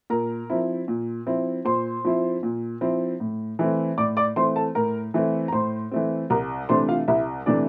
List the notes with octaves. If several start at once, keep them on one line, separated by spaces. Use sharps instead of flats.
A#2 A#4 A#5
F3 C4 E4
A#2
F3 C4 E4
A#2 C5 C6
F3 C4 E4
A#2
F3 C4 E4
A2
E3 A3 C4
A2 D5 D6
D5 D6
E3 A3 C4 C5 C6
A4 A5
A2 A#4 A#5
E3 A3 C4
A#5
A2 C5 C6
E3 A3 C4
C2 A#4 A#5
C3 E3 A3 D4 C5 C6
F4 F5
C2 E4 E5
C3 E3 A3 D4 D5